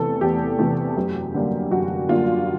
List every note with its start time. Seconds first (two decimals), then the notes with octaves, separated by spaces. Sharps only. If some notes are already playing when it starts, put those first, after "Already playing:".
Already playing: E2 C3 E3 A3 A4
0.21 E2 G4
0.59 C3 E3 A3
0.97 F#2
1.34 D3 G3 A#3
1.71 F#2 F#4
2.09 D3 G3 A#3 F4